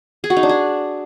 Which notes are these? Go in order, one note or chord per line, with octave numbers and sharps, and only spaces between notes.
G#4
F#4
D#4
D4
G#4